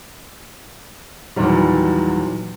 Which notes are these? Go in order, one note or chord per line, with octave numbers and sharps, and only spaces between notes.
E2 A#2 D#3 F#3 G3